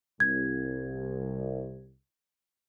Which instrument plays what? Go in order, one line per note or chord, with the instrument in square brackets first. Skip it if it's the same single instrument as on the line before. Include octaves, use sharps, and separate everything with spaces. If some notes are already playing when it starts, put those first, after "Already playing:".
[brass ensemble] C2 [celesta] G#6